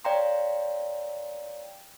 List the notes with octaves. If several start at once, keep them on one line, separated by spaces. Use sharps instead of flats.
C#5 D5 F5 G5 A#5 C6